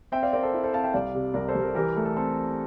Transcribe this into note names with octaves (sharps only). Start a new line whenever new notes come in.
C4 E5 G5
D5 F5
C4 A#4 D5
A4 C5
E4
A4 C5
C4 F5 A5
E5 G5
C2 D5 F5
C3
C2 A#4 D5
A4 C5
C2
G4 A#4
E3 G4 A#4
A3
A4
C4 A4